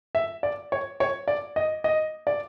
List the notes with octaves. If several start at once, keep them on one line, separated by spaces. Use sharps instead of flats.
E5
D5
C#5
C#5
D5
D#5
D#5
D5